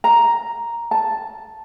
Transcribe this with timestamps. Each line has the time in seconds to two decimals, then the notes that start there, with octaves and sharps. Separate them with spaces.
0.04 A#5
0.91 A5